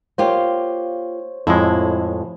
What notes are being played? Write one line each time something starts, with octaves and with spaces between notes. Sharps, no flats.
A#3 F4 G4 C5 C#5
F2 A2 G#3 E4